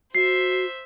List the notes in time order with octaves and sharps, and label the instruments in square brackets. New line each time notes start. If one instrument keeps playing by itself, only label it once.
[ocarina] F#4 [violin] C5 E5 [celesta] C7